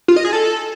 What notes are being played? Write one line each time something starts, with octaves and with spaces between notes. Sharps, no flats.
F4
D#5
G#4
A4